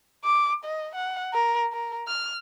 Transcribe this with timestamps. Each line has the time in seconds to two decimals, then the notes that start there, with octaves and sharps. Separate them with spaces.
0.24 D6
0.64 D#5
0.95 F#5
1.33 A#4
1.72 A#4
2.08 F6